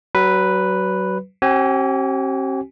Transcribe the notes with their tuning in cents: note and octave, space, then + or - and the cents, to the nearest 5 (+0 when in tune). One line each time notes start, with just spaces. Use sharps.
F#3 +30 B4 +0
C4 +45 G4 -40 G#5 -10